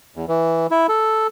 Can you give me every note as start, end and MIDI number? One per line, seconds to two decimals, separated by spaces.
0.16 0.25 40
0.28 0.67 52
0.71 0.87 64
0.89 1.27 69